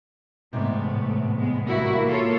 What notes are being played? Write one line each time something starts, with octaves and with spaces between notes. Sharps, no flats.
E2 G#2 C3 A3 B3
A2
G#3 B3
G3 A#3 E4 F#4
F4 A4 C#5